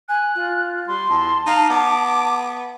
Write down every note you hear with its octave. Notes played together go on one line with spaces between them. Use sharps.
G#5 F#6
F4
G3 C6
E2 A5
D#4 F5
B3 D6